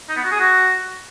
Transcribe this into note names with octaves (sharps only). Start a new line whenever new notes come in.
D#4
B3
F#4
G#4
F#4